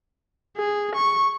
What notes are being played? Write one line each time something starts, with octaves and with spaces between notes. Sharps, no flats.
G#4
C#6